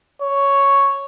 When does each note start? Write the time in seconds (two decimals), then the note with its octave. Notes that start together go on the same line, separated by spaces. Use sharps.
0.22 C#5